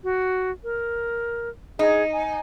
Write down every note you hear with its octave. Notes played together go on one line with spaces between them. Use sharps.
F#4
A#4
D#4 G#4
G#5